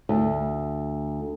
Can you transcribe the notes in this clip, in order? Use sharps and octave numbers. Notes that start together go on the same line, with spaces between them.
D2